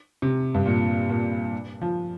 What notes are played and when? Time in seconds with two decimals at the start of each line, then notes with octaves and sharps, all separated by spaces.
0.22 C3
0.54 G2
0.66 A#2
1.09 A#2
1.81 F3